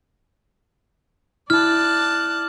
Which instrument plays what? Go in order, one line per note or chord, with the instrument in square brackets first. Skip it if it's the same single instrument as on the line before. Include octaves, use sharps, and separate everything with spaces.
[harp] E4 [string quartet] D5 A5 F#6 [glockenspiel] F6